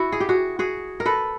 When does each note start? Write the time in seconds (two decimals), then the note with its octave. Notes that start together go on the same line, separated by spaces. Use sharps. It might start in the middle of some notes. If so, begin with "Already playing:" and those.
Already playing: E4 F#4
0.12 G#4
0.20 G4
0.29 F#4 G#4
0.59 F#4 G#4
1.00 A#4
1.06 A4 B4